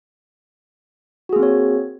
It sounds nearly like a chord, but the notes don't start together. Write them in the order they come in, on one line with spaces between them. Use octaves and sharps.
F#4 G#4 A#3 C4 C#5